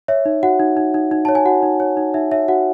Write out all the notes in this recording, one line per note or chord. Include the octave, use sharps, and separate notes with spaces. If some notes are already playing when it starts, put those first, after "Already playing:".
C#5 E5
D#4
F#4 F#5
D#4
D#4
D#4
D#4
C#5 A5
G#5
F#4 F#5
D#4
C#5
D#4
D#4 E5
C#5 E5
F#4 F#5